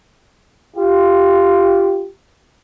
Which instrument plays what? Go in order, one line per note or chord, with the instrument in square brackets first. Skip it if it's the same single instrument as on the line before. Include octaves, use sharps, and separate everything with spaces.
[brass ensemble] F4 G4